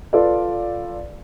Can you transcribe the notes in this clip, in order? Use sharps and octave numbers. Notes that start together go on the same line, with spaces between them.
F4 A4 B4 D5